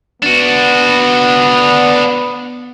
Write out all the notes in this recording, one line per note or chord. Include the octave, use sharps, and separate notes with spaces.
B3 D4 F#4